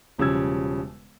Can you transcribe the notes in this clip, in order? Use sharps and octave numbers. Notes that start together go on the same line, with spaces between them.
E1 C#3 F3 G3 E6 G#6